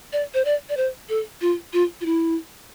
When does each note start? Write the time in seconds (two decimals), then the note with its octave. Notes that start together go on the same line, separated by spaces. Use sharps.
0.13 D5
0.34 C5
0.45 D5
0.69 D5
0.77 C5
1.09 A4
1.41 F4
1.73 F4
2.01 F4
2.05 E4